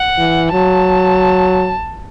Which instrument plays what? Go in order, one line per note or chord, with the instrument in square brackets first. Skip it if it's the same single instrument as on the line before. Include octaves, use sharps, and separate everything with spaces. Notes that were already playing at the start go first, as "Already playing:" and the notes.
Already playing: [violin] F#5
[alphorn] E3
[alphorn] F#3 [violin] A5